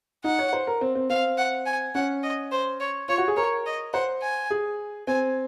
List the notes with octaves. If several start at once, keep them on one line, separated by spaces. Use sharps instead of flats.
D#4 F#5
C#5
C5
A#4
C4
C4
C4 F5
F#5
G#5
C#4 F#5
D#5
C5
C#5
F4 C#5
F#4
G#4
A#4 C#5
D#5
C5 F#5
G#5
G#4
C4 G#5